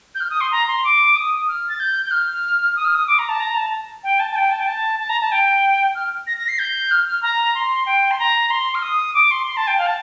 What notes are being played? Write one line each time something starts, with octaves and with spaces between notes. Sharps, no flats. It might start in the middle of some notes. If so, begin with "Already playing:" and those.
G6
F6
D#6
C6
A#5
C6
D6
D#6
F6
A6
G6
G6
F6
D#6
F6
D#6
D6
A#5
A5
A#5
A5
G5
A5
A5
G5
A5
G5
A5
A5
A#5
A5
G5
F6
A#6
A#6
C7
G6
F6
F6
A#5
C6
G5
C6
A#5
C6
F6
D#6
D6
C6
C6
A5
G5
F5
A5